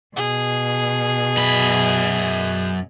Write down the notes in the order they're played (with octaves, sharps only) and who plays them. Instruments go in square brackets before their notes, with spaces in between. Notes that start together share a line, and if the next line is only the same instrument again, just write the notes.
[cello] B2 [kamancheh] G#4
[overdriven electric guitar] F#2 B5